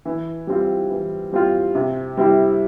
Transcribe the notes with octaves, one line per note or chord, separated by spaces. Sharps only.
E3
G3 C4 F4
E3
G3 C4 F4
C3
G3 C4 E4